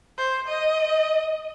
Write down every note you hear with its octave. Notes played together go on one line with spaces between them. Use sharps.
C5
D#5